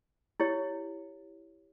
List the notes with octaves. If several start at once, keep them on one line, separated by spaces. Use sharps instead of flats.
E4 G4 C#5